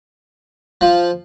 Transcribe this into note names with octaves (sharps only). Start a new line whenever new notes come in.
F3